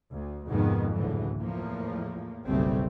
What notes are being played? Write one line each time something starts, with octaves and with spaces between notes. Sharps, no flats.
D2
F2 G#2 C3 D#3 B3
F#1 D2 A2 D3 E3
E2 A2 F3 A#3
F#1 B1 C#3 G3 A3 C4